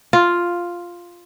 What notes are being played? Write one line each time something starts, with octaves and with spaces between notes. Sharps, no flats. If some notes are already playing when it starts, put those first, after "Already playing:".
F4